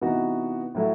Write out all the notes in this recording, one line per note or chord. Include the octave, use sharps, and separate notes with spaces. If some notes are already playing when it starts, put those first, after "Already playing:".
C3 E3 B3 D#4 F#4
A2 F#3 A3 E4